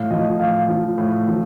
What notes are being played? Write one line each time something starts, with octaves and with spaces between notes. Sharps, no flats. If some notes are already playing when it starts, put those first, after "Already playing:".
Already playing: A2 F5
F3 D#5
A2 F5
F3
A2
F3